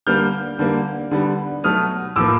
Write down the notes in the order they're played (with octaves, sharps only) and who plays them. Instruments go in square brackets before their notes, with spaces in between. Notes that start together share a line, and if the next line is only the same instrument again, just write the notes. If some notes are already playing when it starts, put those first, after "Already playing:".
[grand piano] D3 G3 A#3 F6 G6
D3 G3 A#3
D3 G3 B3
B2 F#3 A3 D#6 F6
A2 F3 A#3 D6 E6